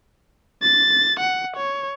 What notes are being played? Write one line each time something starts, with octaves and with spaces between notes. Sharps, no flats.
A6
F#5
C#5